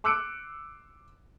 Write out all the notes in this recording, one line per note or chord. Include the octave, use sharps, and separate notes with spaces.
C6 D6 E6 F#6 C#7 D7